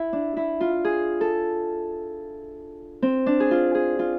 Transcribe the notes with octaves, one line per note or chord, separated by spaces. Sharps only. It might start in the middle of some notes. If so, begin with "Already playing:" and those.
Already playing: E4
D4
E4
F4
G#4
A4
C4
D4
G#4
F4
G#4
F4